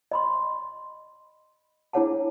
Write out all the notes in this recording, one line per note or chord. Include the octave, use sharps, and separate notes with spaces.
D#5 B5 C6
D4 E4 G#4 C#5 F#5 A5